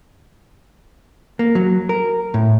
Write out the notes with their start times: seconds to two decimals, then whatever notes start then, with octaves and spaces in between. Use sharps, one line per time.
1.39 A#3
1.55 F#3
1.89 A#4
2.34 A2